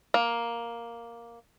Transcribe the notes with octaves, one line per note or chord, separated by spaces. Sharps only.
A#3